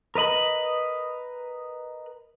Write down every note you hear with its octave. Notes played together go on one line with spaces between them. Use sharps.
A#4 B4 D#5 B5